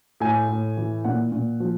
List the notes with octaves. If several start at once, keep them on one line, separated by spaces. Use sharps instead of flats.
A2 G#5
A2
E3
A#2 F#5
A#2
F3